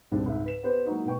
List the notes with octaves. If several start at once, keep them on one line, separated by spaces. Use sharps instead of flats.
G#1 C#2 G3 C4 D4 A5
C#2 G#2 E5
B4 B6 E7
B3 G4 B4 C5
F#3 G#3 A#3 D#4 E4 F#4
B2 G#3 B4 G5 C#6